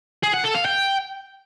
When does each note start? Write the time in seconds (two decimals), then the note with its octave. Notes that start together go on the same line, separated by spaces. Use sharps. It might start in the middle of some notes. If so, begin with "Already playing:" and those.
0.24 G#4
0.34 F#5
0.44 A4
0.55 F5
0.65 G5